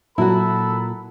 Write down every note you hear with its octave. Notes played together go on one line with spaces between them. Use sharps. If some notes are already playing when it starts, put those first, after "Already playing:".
A#2 F#3 E4 F#4 A4 B5